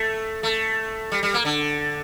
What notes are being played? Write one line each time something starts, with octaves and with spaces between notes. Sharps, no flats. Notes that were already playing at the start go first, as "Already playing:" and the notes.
Already playing: A3
A3
G3
G3
A#3
D3